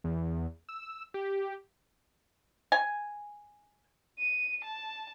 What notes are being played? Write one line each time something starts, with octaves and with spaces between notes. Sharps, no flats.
E2
E6
G4
G#5
D#7
A5